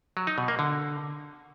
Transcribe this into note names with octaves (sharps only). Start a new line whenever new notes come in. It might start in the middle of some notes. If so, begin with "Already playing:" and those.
F#3
D#4
B2
A#3
D3